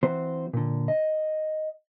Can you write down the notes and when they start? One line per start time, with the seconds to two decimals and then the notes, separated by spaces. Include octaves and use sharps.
0.03 E3 C4 F#4 C5
0.53 A#2 D3
0.88 D#5